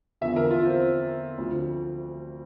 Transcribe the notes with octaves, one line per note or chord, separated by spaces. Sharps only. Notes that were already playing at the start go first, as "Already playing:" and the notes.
E2 D3 F3 E5
A#4
F4
C4
D2 D3 F3